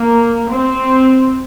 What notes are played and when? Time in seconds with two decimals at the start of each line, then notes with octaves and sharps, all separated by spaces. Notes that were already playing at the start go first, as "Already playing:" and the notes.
Already playing: A#3
0.51 C4